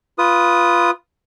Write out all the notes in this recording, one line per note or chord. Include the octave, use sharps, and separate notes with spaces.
F4 B4 D#6